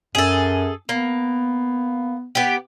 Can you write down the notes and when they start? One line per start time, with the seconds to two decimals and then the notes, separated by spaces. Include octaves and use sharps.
0.15 F#2 G#4 A4
0.89 A#3 B3
2.35 B3 G4